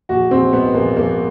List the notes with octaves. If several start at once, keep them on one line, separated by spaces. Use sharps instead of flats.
A#1 F#4
A#1 C4
G#2 B3
A#1 A#3
A#1 A#3